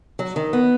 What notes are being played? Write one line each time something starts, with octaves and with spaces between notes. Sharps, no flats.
F#3
D#3
B3